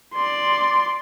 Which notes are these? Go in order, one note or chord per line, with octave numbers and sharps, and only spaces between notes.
D5 C6